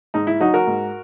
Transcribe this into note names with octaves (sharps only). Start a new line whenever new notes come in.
G#2 D#4
E4
F#3 D#4 F#4
F#4 A#4
G#2